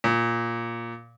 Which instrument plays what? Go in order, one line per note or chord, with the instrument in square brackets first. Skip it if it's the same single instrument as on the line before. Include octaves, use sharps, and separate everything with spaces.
[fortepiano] A#2